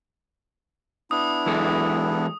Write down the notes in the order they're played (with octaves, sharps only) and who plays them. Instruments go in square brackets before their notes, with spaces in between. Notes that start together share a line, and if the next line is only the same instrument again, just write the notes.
[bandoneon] B3 D4 E4 [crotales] D#6
[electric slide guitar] E3 G#3 A4